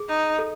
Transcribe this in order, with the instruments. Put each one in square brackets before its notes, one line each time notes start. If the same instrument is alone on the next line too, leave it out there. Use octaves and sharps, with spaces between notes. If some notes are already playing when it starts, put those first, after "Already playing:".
Already playing: [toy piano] G#4
[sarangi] D#4
[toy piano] A4